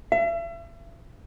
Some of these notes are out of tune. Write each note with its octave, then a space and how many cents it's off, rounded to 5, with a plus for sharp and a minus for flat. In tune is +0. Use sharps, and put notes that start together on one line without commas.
E5 +40